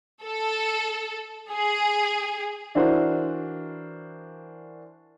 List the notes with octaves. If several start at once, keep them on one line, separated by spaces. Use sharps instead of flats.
A4
G#4
E3 D4 E4 F#4 A#4 C5